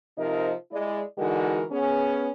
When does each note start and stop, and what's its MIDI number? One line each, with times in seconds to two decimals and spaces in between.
0.17 0.51 48
0.17 0.51 53
0.17 0.51 63
0.17 0.51 70
0.17 0.51 75
0.71 1.01 56
0.71 1.01 64
0.71 1.01 74
1.18 1.63 50
1.18 1.63 52
1.18 1.63 56
1.18 1.63 63
1.18 1.63 66
1.18 1.63 70
1.71 2.30 59
1.71 2.30 61
1.71 2.30 68